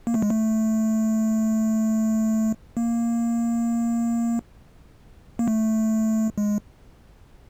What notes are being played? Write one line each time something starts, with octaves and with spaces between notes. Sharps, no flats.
A#3
A3
G#3
A3
A#3
A#3
A3
G#3